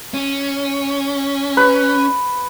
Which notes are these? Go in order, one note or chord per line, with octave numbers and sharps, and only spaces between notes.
C#4
B4